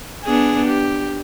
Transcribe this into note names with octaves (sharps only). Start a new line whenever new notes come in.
B3 D4 G#4
G4